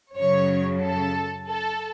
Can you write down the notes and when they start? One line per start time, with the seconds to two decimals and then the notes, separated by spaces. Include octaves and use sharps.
0.16 F#2 C#3 F#3 C#5
0.82 A4
1.49 A4